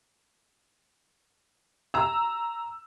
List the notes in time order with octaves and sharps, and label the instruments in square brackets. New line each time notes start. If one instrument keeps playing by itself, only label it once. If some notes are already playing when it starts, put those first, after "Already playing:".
[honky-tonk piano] A#5 E6